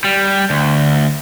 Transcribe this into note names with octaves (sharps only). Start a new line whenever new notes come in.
G3
D2